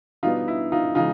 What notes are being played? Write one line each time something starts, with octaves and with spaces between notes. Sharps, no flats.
B2 G3 B3 D4 D#4 F4
E4
D#4 F4
C#3 E3 G#3 D#4 F4